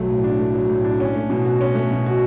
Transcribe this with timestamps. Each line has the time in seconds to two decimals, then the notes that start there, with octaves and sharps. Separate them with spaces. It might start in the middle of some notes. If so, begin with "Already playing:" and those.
Already playing: B1 F#3 A3
0.10 A2
0.24 D4
0.39 A3
0.55 F#3
0.70 A2
0.84 D4
1.00 C#4
1.16 A3
1.30 B2
1.45 F#4
1.61 C#4
1.75 A3
1.91 B2
2.06 F#4